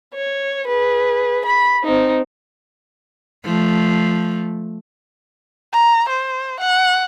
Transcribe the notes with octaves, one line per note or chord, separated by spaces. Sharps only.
C#5
G#4 B4
B5
C4 D#4
F3 A3
A#5
C5
F#5